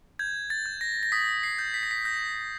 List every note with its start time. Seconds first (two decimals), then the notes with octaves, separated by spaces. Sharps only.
0.19 G6 G#6
0.50 A6
0.66 G6
0.81 A#6
1.03 A#6
1.12 D#6 B6
1.43 C7
1.59 G6
1.74 B6
1.83 A#6
1.91 B6
2.05 G6 A#6